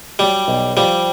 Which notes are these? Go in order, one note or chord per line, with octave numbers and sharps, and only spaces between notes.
F#3 G3
B1
F3 G3